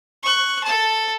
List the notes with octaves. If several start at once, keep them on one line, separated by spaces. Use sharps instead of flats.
C#6 F#6
A4 A5